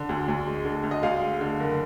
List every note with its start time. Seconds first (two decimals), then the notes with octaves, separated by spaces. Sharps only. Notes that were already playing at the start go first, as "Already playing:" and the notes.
Already playing: D3
0.09 D2
0.28 D2
0.46 G#3
0.65 D3
0.83 D2
0.91 D#5
1.03 D2 F5
1.22 G#3
1.41 D3
1.60 F#1